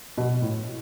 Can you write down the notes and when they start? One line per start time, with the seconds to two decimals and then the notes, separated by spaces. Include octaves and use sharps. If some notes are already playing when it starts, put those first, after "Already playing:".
0.18 B2
0.42 A2